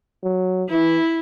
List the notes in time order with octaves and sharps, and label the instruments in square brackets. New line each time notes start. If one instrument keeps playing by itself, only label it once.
[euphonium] F#3
[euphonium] E3 [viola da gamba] E4